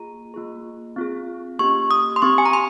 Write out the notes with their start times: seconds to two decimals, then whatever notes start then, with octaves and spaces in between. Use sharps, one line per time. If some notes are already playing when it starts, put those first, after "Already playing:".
Already playing: A#3 F4 G#4 A#5
0.34 A#3 F4 G#4
0.96 C4 F4 G#4
1.59 A#3 C#4 G4 C#6
1.91 D#6
2.16 C6
2.22 C4 G4 C#6
2.38 G#5
2.46 A#5
2.53 C6